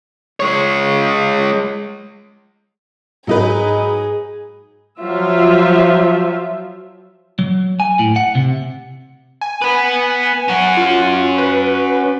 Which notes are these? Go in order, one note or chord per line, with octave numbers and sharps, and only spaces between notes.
G#3 C#5
G#2 F#3 D#4 G#4 B4
F3 F#3 F4 E5
F#3
G#5
A2
F#5
C3
G#5
B3 B4
C#4 F#4
F4
B4